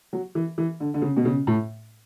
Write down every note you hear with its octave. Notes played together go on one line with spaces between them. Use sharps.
F#3
E3
E3
D3
D3
C#3
B2
C#3
A2